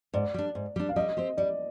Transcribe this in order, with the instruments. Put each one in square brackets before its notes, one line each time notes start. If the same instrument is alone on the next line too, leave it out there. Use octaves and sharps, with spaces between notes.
[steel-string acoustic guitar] G#2 [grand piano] D5
[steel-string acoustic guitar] G3 D4
G#2
G3 D4
[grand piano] F5
[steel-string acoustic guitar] G3 [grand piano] D#5
[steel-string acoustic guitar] C4 G4 C5
[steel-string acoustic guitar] G3 [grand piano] D5